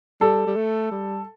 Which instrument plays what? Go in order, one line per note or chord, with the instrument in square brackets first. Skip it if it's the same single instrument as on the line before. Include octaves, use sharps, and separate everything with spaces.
[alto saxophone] G3 [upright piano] A4
[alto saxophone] G3
A3
G3